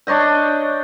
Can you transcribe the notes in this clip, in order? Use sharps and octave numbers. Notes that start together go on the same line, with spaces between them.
D4 C#5 D#5 G5